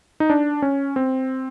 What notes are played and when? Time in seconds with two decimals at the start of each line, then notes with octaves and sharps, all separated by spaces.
0.20 D#4
0.30 D4
0.62 C#4
0.96 C4